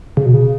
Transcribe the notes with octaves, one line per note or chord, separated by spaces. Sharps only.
C#3
B2
C#3